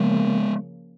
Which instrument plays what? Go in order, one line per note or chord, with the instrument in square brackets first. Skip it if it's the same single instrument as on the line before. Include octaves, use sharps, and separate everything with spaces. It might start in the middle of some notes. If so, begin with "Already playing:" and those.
Already playing: [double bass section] C#3 F3 A#3 [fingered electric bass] G#3 B3